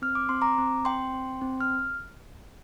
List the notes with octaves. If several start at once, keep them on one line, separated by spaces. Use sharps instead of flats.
C4 F6
D6
C4 C6
A#5 D6
C4
C4 G5 C6
C4
C4
F6